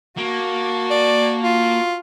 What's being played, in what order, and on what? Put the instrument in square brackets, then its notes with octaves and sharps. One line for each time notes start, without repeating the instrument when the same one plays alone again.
[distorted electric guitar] A#3 [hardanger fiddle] F#4 A5
[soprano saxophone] D5
F4